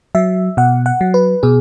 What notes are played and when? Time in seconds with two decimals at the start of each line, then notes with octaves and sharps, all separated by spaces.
0.15 F#3 E5
0.57 B2 F#5
0.86 F#5
1.01 F#3
1.14 B4
1.43 B2 G#4